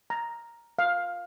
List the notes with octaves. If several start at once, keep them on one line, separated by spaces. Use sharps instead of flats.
A#5
F5